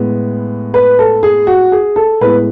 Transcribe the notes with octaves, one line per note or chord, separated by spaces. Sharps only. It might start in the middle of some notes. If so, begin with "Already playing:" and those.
Already playing: A2 G#3 B3
B4
A4
G#4
F#4
G#4
A4
A2 G#3 B3 B4